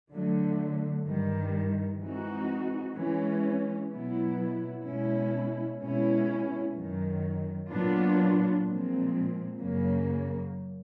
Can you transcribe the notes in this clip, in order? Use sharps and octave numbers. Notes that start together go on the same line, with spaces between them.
D3 F#3 A3
G2 D#3 G3
E3 G#3 C4 D#4 F#4
E3 G#3 C#4
B2 F#3 B3 E4
B2 G#3 C#4 E4
B2 G#3 C#4 E4
F#2 D#3 F#3
A#2 F#3 B3 D4 F4
A#2 F3 G#3 C4
F#2 C#3 F#3 A#3